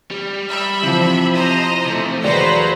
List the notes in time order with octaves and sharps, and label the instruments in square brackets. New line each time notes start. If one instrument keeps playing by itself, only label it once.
[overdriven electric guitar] G3
[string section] E5 B5
[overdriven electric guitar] C3 [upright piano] E3 F3
[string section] C5 D#5 A#5
[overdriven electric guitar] C3 A3
[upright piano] E1 D5 [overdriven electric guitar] F#3 [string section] B4 C5 A#5